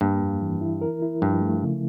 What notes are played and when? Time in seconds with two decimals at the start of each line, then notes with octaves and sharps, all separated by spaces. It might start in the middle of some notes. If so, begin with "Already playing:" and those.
0.01 G2 A#3
0.21 F2
0.42 E3
0.61 E4
0.81 A#4
1.02 E4
1.22 G2 F3
1.41 A3
1.62 C#3